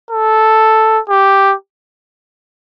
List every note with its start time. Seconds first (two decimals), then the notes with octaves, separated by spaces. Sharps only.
0.10 A4
1.09 G4